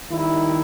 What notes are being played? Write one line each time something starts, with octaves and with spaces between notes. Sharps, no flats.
D#2 D#3 G3 E4